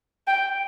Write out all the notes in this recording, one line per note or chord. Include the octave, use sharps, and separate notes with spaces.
G5